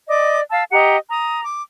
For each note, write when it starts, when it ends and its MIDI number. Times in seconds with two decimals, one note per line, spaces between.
0.08 0.39 74
0.08 0.39 75
0.08 0.39 86
0.50 0.63 77
0.50 0.63 81
0.50 0.63 88
0.72 0.96 67
0.72 0.96 75
0.72 0.96 78
0.72 0.96 82
1.09 1.44 82
1.09 1.44 87
1.44 1.61 86